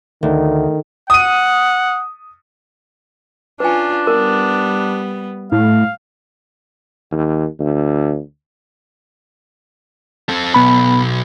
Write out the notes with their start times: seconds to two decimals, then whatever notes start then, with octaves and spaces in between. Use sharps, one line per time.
0.23 D2 D#3
1.10 F#5 D#6 D#7
3.60 C#4 D4 F4 B4 G#5
4.07 G3 B3 A#4
5.52 A2 F5
7.12 D#2
7.59 D2
10.29 C4 A4
10.54 B1 B3 B5